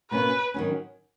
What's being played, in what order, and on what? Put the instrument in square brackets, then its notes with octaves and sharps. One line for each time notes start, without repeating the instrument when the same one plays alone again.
[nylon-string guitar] B2 A#3 C#4 [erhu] B4
[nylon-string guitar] D#3 F#3 C#4